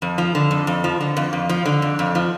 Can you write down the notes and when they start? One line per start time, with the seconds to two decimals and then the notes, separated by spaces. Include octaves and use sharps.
0.02 F2
0.18 F3
0.35 D3
0.51 F2
0.67 F2
0.84 F3
1.01 D3
1.17 F2
1.33 F2
1.49 F3
1.66 D3
1.82 F2
1.99 F2
2.15 F3